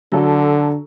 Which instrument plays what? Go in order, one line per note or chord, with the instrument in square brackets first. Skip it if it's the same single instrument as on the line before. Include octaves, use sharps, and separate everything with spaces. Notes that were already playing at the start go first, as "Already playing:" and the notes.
[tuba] D3 [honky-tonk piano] F#3 A4